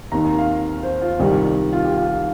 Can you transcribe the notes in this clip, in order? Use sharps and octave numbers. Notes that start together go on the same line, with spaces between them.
D#2 D#3 C4 D#4 A#5
F5
C5
F4
C2 C3 D#3 G3 D#4 G4
F4
G4
F4